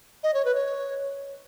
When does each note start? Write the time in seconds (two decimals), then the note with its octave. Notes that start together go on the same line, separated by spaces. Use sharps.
0.23 D#5
0.34 C#5
0.45 B4
0.55 C#5